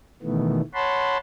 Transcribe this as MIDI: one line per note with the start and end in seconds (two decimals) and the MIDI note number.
0.23 0.61 47
0.23 0.61 51
0.23 0.61 52
0.23 0.61 57
0.23 0.61 59
0.74 1.17 73
0.74 1.17 78
0.74 1.17 81
0.74 1.17 83
0.74 1.17 84